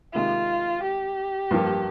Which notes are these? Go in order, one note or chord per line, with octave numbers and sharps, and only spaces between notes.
C3 D#3 G#3 F4
G4
G2 F3 A#3